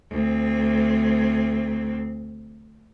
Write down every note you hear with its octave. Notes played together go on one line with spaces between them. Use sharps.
D2 C4